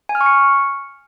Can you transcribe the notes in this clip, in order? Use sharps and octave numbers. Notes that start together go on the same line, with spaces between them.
G#5
F6
C#6
C#7